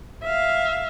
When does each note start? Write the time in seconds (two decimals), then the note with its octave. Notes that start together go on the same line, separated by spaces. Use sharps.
0.23 E5 F5